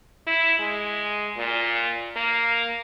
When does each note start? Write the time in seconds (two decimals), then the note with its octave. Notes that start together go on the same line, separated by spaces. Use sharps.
0.27 E4
0.59 G#3
1.37 A#2
2.16 A#3